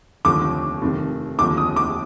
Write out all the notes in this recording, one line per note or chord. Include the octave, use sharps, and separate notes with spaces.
F1 D#2 D3 F3 D6
F1 F2 D#3
F1 D#2 D3 F3 D6
D#6
D6